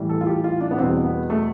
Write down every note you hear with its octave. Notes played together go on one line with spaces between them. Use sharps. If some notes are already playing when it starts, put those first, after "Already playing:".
Already playing: A2 E3 G3
A4
F4
G4
F4
D4
B3
E2 B2 G3 C4
B3
A3